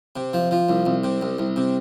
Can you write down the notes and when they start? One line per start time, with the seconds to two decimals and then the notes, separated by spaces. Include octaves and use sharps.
0.16 C3
0.33 F3
0.51 F3
0.69 C2
0.86 C2
1.04 C3
1.21 C2
1.38 C2
1.56 C3